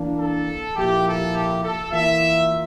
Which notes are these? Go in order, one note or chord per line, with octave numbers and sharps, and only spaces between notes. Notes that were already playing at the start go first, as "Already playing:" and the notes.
Already playing: E3 A#3 D4
A4
A#2 F3 A#3 E4 G4
A4
G4
A4
E3 A#3 F4 E5